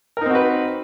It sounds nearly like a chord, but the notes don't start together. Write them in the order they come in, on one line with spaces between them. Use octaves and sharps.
A#4 D#4 C4 F#4 B4